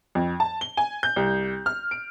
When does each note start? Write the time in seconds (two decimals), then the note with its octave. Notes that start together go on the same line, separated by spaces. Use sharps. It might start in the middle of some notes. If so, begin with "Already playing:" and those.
0.15 F2
0.40 A5
0.61 G7
0.77 G#5
1.03 G6
1.16 C2
1.66 F6
1.91 D7